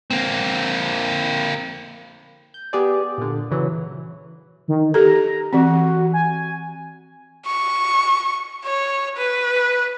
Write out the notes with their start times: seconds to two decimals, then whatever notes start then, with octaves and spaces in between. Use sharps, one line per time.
0.10 A#3 C4
2.54 G6
2.73 B3 G4 G#4 D5
3.18 A#2 D3
3.51 C#3 E3 F#3
4.68 D#3
4.94 G4 A4 A#5
5.53 E3 C4 F#4
6.13 G#5
7.46 C#6
8.65 C#5
9.17 B4